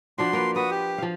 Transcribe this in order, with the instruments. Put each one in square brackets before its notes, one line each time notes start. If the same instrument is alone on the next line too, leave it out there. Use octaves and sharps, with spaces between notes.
[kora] F3 D4 F#4 [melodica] C6
[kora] A#3 F4 B4
[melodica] F#4 D#6 [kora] B4
[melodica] G4
[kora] F3 F5